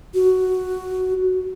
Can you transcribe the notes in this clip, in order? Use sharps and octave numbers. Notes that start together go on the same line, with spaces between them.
F#4